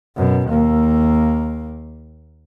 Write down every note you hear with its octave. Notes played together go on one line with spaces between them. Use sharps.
F#2 B2
D#2 A#3